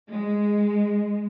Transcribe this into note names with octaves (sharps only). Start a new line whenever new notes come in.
G#3